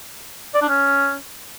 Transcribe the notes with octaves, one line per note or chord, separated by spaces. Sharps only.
D5
D4
C#4